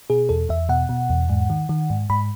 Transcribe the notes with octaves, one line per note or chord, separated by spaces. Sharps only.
B2 G#4
E2 A4
E2 E5
B2 F#5
B2
E2
G#2
D#3
D#3
G#2
G#2 B5